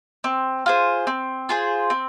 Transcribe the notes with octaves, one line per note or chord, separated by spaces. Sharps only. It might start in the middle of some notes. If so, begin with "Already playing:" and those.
C4
F4 G#4 C5
C4
F4 G#4 C5
C4